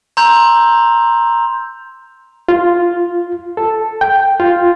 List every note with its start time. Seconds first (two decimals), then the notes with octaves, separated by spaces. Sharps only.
0.17 A#5 C6 E6 G6 F7
2.49 F4
3.57 A4
4.01 G5
4.40 F4